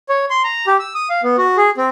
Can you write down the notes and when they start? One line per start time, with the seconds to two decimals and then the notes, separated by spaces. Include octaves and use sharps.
0.09 C#5
0.30 C6
0.44 A#5
0.67 G4
0.79 E6
0.94 D#6
1.10 F5
1.23 B3
1.38 F#4
1.57 G#4
1.77 C4